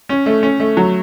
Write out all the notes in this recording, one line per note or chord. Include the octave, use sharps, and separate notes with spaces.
C#4
A3
C#4
A3
F#3